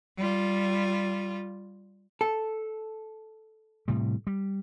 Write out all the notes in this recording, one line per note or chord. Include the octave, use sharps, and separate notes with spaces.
G3 F4
A4
A2 C3 G3
G3